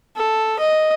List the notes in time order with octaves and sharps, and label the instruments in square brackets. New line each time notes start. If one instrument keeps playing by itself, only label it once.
[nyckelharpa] A4
D#5